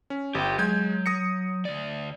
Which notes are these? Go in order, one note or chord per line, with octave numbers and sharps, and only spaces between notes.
C#4
G1 G4 G5
F#3 G#3 G6 G#6
D#6 A#6 C#7
D2 D5